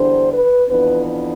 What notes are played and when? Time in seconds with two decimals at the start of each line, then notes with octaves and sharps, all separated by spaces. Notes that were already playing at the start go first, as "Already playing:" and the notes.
Already playing: E2 D3 G3 D4 C5
0.32 B4
0.69 F2 E3 B3 D4 B4